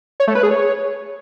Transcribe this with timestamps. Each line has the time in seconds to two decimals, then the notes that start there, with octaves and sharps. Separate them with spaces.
0.20 C#5
0.28 A3
0.35 B4
0.43 G#4
0.51 C#5